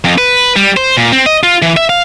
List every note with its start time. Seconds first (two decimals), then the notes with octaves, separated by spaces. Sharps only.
0.04 F2
0.18 B4
0.56 G3
0.77 C5
0.97 A#2
1.12 C4
1.26 D#5
1.43 F4
1.62 E3
1.77 E5
1.89 F5